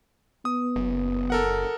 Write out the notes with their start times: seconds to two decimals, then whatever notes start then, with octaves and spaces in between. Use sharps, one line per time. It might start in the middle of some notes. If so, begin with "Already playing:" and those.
0.45 B3 D#6
0.76 F#1
1.30 A4 A#4 F#5